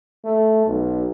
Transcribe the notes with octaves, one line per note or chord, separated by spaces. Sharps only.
A3
B1